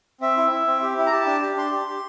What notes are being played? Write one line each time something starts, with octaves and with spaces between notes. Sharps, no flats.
C4 E5
E4
E4
C4
G4
E4
A#5
G4 A5
D4
G4
D4 C6
G4
G4